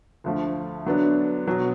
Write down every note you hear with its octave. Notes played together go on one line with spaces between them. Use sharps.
D2 D3 F3 A3 F4
D3 F#3 B3 D4
B2 F#3 B3